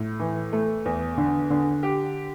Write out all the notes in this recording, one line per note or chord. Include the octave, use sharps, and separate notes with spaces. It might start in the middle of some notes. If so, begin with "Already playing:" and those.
Already playing: A2
E3
A3
E2
D3
D3
G4